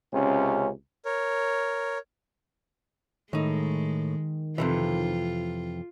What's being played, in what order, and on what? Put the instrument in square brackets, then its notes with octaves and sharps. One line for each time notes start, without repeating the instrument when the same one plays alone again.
[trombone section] C#2 C3 C#4
[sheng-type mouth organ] A#4 C#5
[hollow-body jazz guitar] A2 D#4 [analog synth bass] D#3 [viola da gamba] G#3
[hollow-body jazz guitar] F2 C3 E3 [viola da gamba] F4